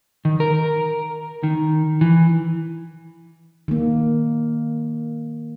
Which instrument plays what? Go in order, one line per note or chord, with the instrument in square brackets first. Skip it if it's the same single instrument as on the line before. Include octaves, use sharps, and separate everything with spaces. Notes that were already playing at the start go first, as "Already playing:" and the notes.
[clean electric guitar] D#3
A#4
D#3
E3
[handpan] D#3 A#3